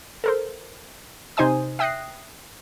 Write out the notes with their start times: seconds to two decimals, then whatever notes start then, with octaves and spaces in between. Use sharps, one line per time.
0.24 A4 A#4 C5
1.37 C3 D#4 C5 D#5 G#5 D#6
1.79 E5 G5 D#6 F#6 A#6 C7